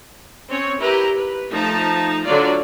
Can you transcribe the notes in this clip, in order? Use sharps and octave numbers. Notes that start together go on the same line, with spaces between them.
C4 C#4 C#5
E4 G4 A#4 B4 A#5
B4
F3 A3 D#4 A5 A#5
D3 F#3 F4 D5